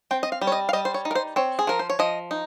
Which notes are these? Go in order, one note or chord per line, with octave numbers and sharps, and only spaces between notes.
C4 G5
D#5
F5
G3
C#5
D#5
F5
G3 D#5
C5
C#5
D#4
A#4
C5
C4 C#5
G#4
F3 A#4
C5
C#5
F3 D#5
D#4